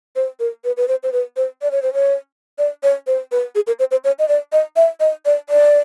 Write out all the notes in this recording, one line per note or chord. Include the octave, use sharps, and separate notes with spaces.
C5
A#4
B4
B4
C5
C5
B4
C5
D5
C#5
C5
C#5
D5
C#5
C5
B4
G#4
A#4
C5
C5
C#5
D#5
D5
D#5
E5
D#5
D5
D5